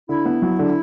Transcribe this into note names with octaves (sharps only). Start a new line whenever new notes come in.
D3 E4
B3
F#3
D3